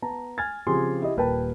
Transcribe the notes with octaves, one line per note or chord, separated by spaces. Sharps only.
B3 A5 A#5
G#5 F6 G#6 A6
C#3 F3 C4 G4 G#4 C6
E4 G4 D#5
D#1 A#4 B4 G5 A5